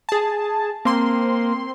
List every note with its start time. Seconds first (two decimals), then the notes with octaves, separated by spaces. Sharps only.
0.09 G#4 A5
0.85 A#3 C4 C6